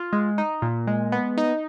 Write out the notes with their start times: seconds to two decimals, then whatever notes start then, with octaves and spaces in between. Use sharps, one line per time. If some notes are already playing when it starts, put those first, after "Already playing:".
Already playing: F4
0.13 G#3
0.38 D#4
0.62 A#2
0.87 G#3
1.12 B3
1.37 D#4